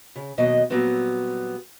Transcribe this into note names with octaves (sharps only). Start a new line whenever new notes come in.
C#3
D#2 B2 F#3 D#5
A#2 F#3 G3 B3 C4